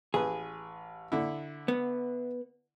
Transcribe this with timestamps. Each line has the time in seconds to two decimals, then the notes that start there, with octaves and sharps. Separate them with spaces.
0.14 A1 G#4 B4
1.12 D3 E4
1.68 B3